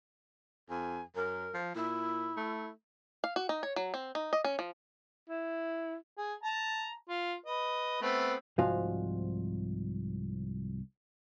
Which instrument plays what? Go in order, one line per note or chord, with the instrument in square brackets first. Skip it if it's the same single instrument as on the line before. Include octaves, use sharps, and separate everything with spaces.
[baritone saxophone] F2 [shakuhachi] G#5
[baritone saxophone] F#2 [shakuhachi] A#4
[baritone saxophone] F3
[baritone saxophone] A#2 [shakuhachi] E4
[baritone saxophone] A3
[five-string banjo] F5
F#4
D#4
C#5
F#3
C4
D#4
D#5
C#4
F3
[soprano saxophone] E4
[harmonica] G#4
A5 A#5
F4
B4 D#5
A3 B3 C4
[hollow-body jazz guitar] C2 G#2 F3 F#4 F5 G#5